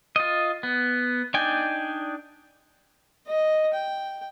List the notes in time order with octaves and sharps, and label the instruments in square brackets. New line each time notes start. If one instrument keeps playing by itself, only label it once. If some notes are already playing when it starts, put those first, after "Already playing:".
[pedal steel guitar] F4 D#5
B3
D4 D#4 D5 G5 G#5
[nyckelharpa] D#5
G5